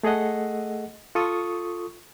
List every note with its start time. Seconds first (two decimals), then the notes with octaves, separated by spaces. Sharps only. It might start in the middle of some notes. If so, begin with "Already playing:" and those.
0.03 A3 G#4 A4 D#5 F#5
1.15 F4 A4 C#6 D#6